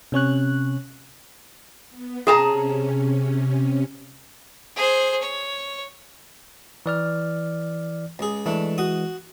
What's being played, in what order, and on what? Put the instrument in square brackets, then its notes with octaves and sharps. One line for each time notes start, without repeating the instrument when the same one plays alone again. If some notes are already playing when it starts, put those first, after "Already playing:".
[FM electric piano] C3 C#4 C#5 F#6
[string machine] B3
[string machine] C3 C#4 [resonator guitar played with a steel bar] G#4 A5 A#5
[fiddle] G#4 C5
C#5
[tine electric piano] E3 D5 F6
[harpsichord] C#2 G#4
[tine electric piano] E3 G#3 [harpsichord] A3 D4
[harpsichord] F#4 D#6